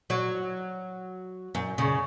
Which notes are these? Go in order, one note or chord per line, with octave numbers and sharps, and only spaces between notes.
F#3
F#2
C#3